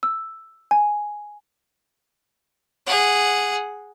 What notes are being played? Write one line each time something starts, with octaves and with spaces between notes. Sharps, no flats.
E6
G#5
G#4 F#5